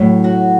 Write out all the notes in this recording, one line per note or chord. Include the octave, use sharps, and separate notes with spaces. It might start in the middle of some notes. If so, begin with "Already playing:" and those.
Already playing: A2 F#3
F#4